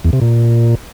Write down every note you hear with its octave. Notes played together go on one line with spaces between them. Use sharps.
E2
C3
A#2